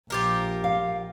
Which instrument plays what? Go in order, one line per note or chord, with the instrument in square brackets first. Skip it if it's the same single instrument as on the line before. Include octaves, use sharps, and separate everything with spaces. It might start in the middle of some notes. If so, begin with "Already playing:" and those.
[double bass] A#1 [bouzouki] F4 G4 A#4
[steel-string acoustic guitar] F5